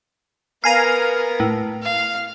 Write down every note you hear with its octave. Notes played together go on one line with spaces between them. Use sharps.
B3 A#4 F5 G#5 A#5
A2
F5